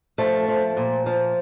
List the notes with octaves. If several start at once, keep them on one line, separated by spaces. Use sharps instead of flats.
F3 A3
F3
A#2
F3